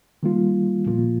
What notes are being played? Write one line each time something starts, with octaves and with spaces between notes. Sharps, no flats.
D#3 G3 A#3 F4
A#2 F3 A#3 F4